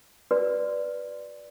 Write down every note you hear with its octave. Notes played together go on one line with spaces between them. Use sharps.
F#4 B4 D5